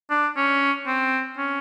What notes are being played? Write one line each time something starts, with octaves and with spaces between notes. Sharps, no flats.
D4
C#4
C4
C#4